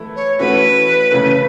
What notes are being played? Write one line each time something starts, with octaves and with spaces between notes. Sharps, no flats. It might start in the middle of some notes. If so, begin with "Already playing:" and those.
Already playing: E3 A3 E4
C#5
E3 A3 C#4 F#4 B4
C#3 E3 A3